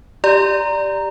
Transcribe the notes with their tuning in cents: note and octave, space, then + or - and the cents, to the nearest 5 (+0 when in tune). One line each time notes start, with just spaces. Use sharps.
G4 +0 D5 +0 A#5 +0